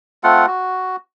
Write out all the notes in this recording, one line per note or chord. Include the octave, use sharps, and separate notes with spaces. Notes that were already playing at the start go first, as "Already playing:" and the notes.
A3 C4 F4 F#5
F#4